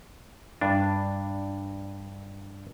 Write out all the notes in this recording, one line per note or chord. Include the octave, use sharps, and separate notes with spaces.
G2 D4